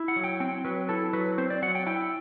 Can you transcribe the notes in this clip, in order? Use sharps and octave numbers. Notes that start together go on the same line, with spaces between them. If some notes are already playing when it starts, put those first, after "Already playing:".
Already playing: E4
F#5
F#3
G5
C4 G5
F#3 B4
E4 A4
F#3 B4
C4 C5
D5
F#3 F#5
G5
E4 G5